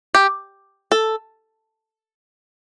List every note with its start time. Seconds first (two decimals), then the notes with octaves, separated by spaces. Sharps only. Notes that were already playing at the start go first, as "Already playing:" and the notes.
0.15 G4
0.92 A4